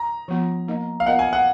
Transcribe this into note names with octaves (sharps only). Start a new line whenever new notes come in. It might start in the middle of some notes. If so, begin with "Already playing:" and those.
Already playing: A#5
F3 B3 F4
A#3 D#4 A#4 D#5
F5
B3 F4 A#4 D#5 F#5
G#5
F#5